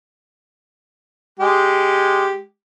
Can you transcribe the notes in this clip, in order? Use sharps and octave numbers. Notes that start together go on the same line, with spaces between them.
G#3 G4